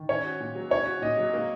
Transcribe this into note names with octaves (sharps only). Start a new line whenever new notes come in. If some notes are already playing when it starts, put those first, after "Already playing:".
Already playing: D#3
C#4 C#5
F#4
A#2
F#3
C#4 C#5
F#4
A#2 D#5
F#3
A#3